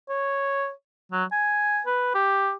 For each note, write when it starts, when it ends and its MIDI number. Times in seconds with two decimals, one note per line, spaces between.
0.09 0.71 73
1.12 1.24 54
1.32 1.81 80
1.86 2.10 71
2.14 2.53 67